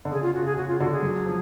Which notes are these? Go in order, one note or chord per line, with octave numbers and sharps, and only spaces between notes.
D3
C#3 G#4
F4
F#4
C#3 G#4
C#3 F#4
F4
D3 F#4
G#4
F#3
F3